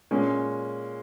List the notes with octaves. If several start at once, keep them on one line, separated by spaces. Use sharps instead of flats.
A#2 G#3 C#4